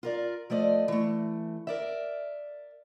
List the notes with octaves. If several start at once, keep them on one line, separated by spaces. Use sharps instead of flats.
F4 A#4 D5
F3 A3 D5 D#5
E3 A3
A#4 D5 E5